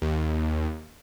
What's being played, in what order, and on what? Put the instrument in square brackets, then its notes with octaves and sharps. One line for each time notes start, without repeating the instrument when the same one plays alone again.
[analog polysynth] D#2